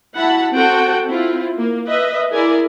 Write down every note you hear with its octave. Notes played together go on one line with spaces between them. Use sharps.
E4 F#4 F#5 A5 B5
C4 F#4 A4 F#5 G5 A5
C4 E4 F4
A#3
B4 D#5 E5
E4 G#4 A#4 D5 G#5